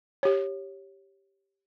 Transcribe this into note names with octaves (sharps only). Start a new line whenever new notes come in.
G4 C#5